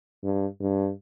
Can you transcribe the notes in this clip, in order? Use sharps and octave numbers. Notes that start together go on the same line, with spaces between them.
G2
G2